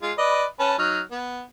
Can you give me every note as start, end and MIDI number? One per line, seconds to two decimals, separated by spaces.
0.02 0.13 56
0.02 0.13 65
0.18 0.45 71
0.18 0.45 74
0.18 0.45 75
0.59 0.77 61
0.59 0.77 71
0.59 0.77 81
0.78 1.00 54
0.78 1.00 63
0.78 1.00 89
1.11 1.42 59